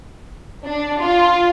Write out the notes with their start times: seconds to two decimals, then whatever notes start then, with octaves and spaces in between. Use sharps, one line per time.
0.66 D4
0.99 F4